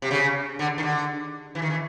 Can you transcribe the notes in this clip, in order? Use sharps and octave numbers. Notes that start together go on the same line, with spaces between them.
C3
C#3
D3
D#3
D3
E3
D#3
E3